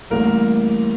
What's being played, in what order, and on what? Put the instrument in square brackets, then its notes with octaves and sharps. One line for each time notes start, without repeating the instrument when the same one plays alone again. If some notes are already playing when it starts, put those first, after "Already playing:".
[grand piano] A1 A2 G3 A#3 A#4